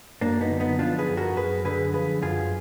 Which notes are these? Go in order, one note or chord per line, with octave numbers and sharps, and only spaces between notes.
F#2 A#3 D4
B3 D#4
D3
B3 D#4
F3 D4 F4
G#4 B4
F#2
F#4 A#4
F#2 G#4 B4
D3 G#4 B4
F3 G#4 B4
F#2 F4 G#4